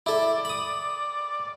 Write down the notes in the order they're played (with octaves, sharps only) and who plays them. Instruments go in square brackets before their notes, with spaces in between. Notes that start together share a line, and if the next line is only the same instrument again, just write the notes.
[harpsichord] E4 A4 [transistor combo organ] D5
[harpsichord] B5 D#6